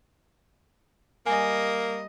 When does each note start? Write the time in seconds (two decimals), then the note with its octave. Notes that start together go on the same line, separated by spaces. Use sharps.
1.26 G3 A#3 D#5 G#5